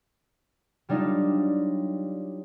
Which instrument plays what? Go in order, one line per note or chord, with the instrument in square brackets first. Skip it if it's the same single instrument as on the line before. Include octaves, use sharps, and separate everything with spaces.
[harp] F#3 G3 D4 D#4 F4